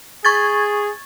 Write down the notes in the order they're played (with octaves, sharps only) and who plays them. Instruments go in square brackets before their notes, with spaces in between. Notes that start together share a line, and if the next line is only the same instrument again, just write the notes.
[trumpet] G#4 [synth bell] C#6 G#6 A6